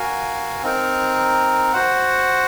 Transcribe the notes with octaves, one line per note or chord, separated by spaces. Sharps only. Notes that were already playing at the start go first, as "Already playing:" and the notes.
Already playing: F#4 A#4 F5 G#5
C4 D#4 A#4
F#4 C5 F#5